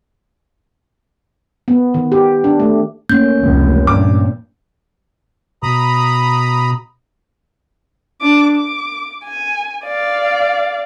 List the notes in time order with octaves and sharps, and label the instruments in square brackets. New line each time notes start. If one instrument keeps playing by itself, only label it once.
[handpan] B3
D#3
G4
D4
A3
[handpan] A3 A#3 C#4 [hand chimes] G6
[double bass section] F1 C#2 [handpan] E3 G3
[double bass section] G2 A#2 [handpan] C4 [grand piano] D6
[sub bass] B2 [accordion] A#5 B5 D#6
[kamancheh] D4 D6
D6
G#5
D5 F5